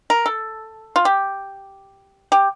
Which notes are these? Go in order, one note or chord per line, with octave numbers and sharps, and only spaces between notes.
A#4
A4
F4
G4
G4